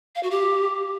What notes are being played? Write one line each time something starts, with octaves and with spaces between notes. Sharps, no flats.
F5
F#4
G4